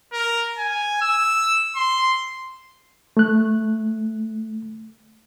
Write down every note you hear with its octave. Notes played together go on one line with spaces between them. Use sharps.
A#4
G#5
E6
C6
A3 F#6